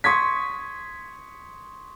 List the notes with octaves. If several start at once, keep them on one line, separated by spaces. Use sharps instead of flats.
C6 C#6 D#6 G#6 B6